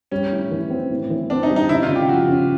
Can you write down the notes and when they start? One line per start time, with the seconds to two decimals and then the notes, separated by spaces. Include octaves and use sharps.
0.12 G3 C#4
0.32 A2
0.51 E3
0.70 C4
0.90 A2
1.10 E3
1.30 C4 D4
1.43 D#4
1.50 G3
1.56 D#4
1.69 C#3 E4
1.83 F4
1.89 C#3
1.96 G4
2.09 F3 F#4
2.28 C#3